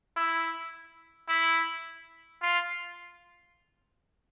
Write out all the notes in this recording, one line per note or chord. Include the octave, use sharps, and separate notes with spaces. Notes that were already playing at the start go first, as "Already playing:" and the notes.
E4
E4
F4